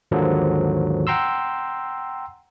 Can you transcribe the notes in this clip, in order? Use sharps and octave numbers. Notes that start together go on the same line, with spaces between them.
D#2 G#2 D3 D#3 F3 F#3
F#5 G5 A#5 C6 E6